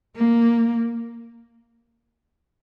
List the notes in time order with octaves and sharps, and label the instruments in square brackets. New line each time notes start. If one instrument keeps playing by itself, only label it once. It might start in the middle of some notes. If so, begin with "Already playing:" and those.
[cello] A#3